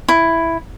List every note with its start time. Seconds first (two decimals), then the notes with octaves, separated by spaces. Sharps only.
0.09 E4